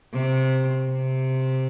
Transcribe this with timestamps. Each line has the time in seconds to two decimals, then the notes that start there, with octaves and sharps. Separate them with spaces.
0.13 C3
0.90 C3